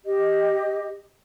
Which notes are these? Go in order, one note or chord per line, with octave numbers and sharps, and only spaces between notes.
G4 D#5